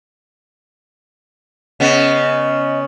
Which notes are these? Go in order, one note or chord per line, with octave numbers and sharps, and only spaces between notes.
C#3 B3 D#5